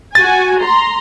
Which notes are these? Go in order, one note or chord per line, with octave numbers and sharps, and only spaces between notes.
F#4 G#5 A6
A#5 C6